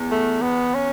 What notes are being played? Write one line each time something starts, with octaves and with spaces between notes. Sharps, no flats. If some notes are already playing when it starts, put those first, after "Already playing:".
Already playing: E2
A3
B3
C#4